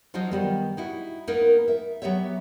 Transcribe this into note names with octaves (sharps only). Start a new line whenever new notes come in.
F3 F#3 D#4 F4 C5 D#5
D#3 G3 B3
D#4 E4 F#4
A#3 B3 D#4 A#4 B4
E5
F#3 B3 G4 C#5 E5